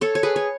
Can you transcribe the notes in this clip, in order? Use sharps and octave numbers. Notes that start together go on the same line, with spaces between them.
A4 C#5
C#5
G#4 B4
C#5